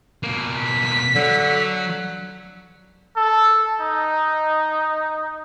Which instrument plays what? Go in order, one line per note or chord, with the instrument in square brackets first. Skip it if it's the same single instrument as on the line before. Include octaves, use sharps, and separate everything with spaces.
[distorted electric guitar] B2 A#3
[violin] B6
[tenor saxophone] D3 [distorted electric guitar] F#3
[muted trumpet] A4
D#4